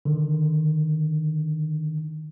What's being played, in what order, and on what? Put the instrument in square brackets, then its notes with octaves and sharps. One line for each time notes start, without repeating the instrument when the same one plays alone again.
[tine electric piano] D3 D#3